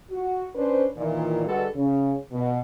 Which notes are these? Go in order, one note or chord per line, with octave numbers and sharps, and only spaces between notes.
F#4
C#4 D4 B4 C5
A#2 D#3 E3
D3 G3 G#3 F#4 A4 B4
C#3
B2